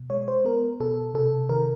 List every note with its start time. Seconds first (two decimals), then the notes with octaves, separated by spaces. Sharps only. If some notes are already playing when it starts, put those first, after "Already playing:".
Already playing: B2
0.10 G#3 C#5
0.28 C5
0.45 B3 A#4
0.80 B2 A4
1.14 C3 A4
1.49 D#3 A#4